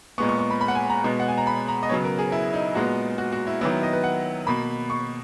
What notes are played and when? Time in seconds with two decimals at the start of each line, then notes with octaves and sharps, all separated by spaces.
0.18 A#2 G#3 B3 C#6
0.29 C#6
0.39 C#6
0.50 B5
0.61 B5
0.68 F#5
0.75 G#5
0.90 A#5
1.04 B2 G#3 B3
1.20 F#5
1.28 G#5
1.38 A#5
1.47 B5
1.68 A#5
1.83 D#5
1.89 B3 C#5
1.92 C#3 F#3
2.04 A#4
2.18 G#4
2.32 E4
2.54 D#4
2.75 A#2 G#3 B3 F#4
3.18 F#4
3.32 F#4
3.47 E4
3.61 D#3 F#3 B3 E4
3.72 E4
3.83 D#5
3.93 B4
4.04 F#5
4.47 B2 A#3 B5
4.90 C#6